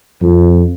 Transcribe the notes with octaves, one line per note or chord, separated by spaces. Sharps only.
F2